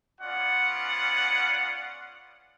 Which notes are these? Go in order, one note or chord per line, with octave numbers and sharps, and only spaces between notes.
B3 C#4 F4 D5 F#5